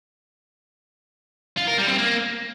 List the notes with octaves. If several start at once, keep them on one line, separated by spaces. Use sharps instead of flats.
F4
A#4
G3
C4
A#3